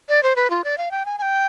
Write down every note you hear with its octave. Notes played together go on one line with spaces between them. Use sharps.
D5
C5
B4
F4
D5
F5
G5
G#5
G#5
G5